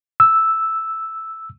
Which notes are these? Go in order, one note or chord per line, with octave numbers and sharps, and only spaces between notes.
E6